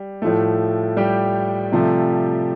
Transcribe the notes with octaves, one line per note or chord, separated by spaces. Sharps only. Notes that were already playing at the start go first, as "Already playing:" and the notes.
Already playing: G3
A2 F3 A3
G3 G4
C3 F3 A3